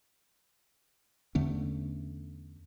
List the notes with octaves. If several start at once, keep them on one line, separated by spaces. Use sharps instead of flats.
E2 D3 A3 C#4